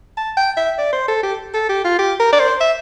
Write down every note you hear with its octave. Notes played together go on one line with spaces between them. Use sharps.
A5
G5
E5
D5
C5
A4
G4
A4
G4
F4
G4
A#4
D5
C5
E5